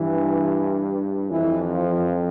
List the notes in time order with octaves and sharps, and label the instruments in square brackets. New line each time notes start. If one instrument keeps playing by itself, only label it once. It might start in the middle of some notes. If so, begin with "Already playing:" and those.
Already playing: [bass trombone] G2 [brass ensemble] E3
[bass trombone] F2 [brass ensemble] E3
[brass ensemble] F3